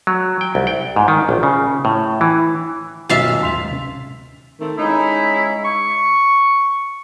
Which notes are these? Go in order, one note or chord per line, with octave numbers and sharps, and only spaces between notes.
F#3
G5
C2
G5
G#2
D#3
A#1
C#3
A2
E3
D#1 B1 E5 F5 A5
A1 D#2 G#3 C6 B6 F7
D1 C3 C#4
D#3 A3 C4
C#3 G#3 D#4 E4
C#6